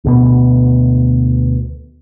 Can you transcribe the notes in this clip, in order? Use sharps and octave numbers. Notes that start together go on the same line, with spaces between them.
D2 B2 B3